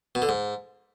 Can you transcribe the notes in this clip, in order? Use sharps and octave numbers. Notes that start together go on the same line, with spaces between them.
B2
D3
G#2